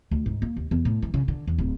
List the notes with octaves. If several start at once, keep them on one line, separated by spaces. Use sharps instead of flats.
D2
G#2
A#3
D#2
E2
A2
E3
C#3
D3
E2
D1